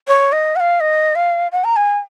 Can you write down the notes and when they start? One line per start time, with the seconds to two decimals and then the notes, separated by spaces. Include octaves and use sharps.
0.08 C#5
0.32 D#5
0.56 F#5
0.60 F5
0.80 D#5
1.15 F5
1.52 F#5
1.64 A#5
1.76 G#5